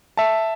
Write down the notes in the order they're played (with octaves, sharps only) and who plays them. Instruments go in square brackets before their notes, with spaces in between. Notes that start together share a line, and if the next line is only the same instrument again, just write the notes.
[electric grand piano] E5 A5